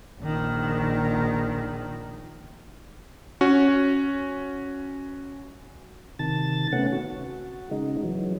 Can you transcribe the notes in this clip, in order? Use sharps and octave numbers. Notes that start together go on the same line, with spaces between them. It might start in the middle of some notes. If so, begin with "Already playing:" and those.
A#1 D#3
C#4 F#4
C3 D#3 A5 A6
C3 A3 B3 C#4 F#5
F#4
C#3 G#3 D#4
E3 F#3